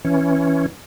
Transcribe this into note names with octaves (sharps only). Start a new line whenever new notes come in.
E3 C#4